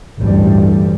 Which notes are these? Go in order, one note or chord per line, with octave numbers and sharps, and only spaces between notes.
A1 D2 G2 G3